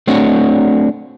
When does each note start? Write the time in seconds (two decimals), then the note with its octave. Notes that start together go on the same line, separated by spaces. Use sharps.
0.07 A3 C4 D4 F#4 C#5